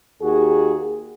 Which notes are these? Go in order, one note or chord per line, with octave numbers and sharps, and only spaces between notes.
D#2 F#4 G#4